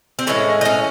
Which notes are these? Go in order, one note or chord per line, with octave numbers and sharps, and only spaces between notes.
C4
A2 E3 G#3 C#4
D#4
C#4